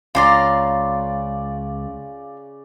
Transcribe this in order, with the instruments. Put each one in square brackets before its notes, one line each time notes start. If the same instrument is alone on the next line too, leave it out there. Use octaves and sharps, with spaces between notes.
[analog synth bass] C#2 [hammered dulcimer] C#3 D5 [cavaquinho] F4 A#5 C6